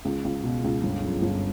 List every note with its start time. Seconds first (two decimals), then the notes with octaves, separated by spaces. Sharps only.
0.05 C#2
0.25 C#2
0.43 B2
0.64 C#2
0.83 G1
1.03 F#2
1.22 G1